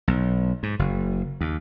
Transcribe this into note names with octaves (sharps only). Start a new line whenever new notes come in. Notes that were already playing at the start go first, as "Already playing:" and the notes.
B1
G#2
F#1
D#2